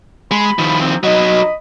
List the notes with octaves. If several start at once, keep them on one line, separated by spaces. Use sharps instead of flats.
G#3 B5
D#3 F3
C4
F#3 D#4 D#5 B5